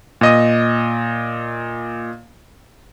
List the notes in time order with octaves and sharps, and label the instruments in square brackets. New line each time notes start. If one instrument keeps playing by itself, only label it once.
[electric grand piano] A#2 D#5 D#6